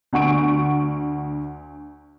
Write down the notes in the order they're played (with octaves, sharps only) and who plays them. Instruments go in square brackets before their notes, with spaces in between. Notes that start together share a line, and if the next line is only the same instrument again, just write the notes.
[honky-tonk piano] D2 F#5 C#6 D7